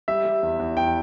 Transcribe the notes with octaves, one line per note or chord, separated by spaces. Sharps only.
G3 E5
G3
E2
E2
E2 G5